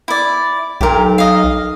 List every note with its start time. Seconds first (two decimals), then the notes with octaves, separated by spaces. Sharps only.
0.08 E4 D5
0.81 B1 G4 A#4
1.18 D#5 F5